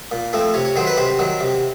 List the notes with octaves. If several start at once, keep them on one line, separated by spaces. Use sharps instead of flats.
A#2
F3 A3 C4
C3 C#5
C#5
D#3 F#3 C5
B4
C3 C5
D#3 F#3
C3